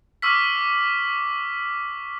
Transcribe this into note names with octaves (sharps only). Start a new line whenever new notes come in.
C#6 D6 E6 F6 B6